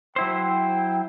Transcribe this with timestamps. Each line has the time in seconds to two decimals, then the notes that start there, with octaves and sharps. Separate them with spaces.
0.16 F#3 E4 C5 G5